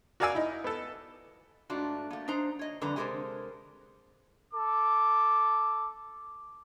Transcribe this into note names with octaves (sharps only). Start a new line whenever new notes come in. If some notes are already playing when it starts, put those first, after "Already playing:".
F#4 A#4 D5 F5 G#5 E6
D#4 E4
B3 A4
G#2 A3 D4 F4 F#4
A3 A#3
D4 D#4 C5 A#5
C#5 D#5
F2 D3 G3 B4 A#5
C3 G#3 G4 A4 A#4 C5
A4 D6